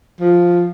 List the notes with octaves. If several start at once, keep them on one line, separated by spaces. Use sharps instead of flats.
F3